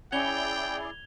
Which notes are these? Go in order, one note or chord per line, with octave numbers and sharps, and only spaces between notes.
C#4 E4 G#4 D5 G5 G#6 F7 G7